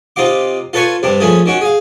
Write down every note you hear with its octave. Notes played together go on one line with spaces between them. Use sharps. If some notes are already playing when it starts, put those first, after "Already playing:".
C3 D#4 F4 F5 D6
F4 A4 B4 C#5 G#5 C#6
G2 C3 D4
F3 A3 C#4 G#4
D#3 C#4 F#4
G#4 F5